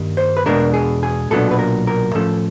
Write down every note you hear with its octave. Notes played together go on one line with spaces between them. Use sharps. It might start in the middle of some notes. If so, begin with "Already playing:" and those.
Already playing: G2 D#3 G3 A#3
C5
B4
E2 B2 G#3 B3 D4 A#4
G#4
G#4
B1 A#2 F#3 B3 D4 A4
B4
A#4
A#4
A2 F3 A3 C#4 A4